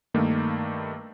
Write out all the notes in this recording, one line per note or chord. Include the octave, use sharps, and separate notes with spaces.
G2 D#3 A3 A#3